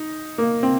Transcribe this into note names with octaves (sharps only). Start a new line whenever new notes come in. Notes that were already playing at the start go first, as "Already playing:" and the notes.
Already playing: D#4
A#3
C4